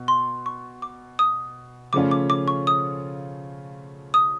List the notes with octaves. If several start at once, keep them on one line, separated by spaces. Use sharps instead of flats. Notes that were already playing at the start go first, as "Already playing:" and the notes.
Already playing: B2
C6
C#6
D6
D#6
C#3 F3 A3 C#4 F4 D6
D6
D6
C#6
D#6
D#6